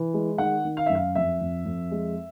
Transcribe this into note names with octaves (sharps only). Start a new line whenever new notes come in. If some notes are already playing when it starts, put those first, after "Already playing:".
Already playing: E3
G#3
D#3 F#5
D#3
F5
F#2 E5
F5
F2 E5
F2
F2
G#3